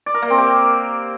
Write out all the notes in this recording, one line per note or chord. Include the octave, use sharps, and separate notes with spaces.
D5
A#4
A#3
C4
G4